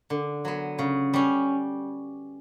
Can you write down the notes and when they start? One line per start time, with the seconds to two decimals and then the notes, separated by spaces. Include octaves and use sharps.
0.10 D3
0.45 F#3 B3
0.79 C#3
1.14 G3 C#4